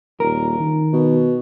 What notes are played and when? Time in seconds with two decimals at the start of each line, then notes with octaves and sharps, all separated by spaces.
0.20 D#1 A#4
0.59 D#3
0.93 B2